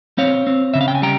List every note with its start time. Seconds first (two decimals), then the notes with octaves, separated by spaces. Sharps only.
0.18 C4 C#5 F5
0.47 C4
0.74 C#3 E5
0.81 F5
0.88 G5
0.95 G#5
1.02 G3 G5 A#5